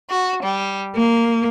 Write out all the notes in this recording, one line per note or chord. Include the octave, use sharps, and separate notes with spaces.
F#4
G3
A#3